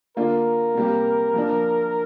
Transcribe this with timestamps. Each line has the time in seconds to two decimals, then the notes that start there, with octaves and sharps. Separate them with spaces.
0.17 D3 A#3 F4 A#4 D5
0.75 C3 G3 A#3 G4
1.34 F3 A#3 D4